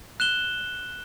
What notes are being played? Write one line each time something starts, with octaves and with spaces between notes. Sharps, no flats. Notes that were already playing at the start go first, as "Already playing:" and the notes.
F#6 E7 G7